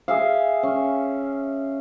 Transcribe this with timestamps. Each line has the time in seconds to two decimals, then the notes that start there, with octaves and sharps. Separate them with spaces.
0.08 G#4 E5 F5
0.63 C#4